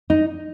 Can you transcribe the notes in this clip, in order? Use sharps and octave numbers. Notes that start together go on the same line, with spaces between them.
D#4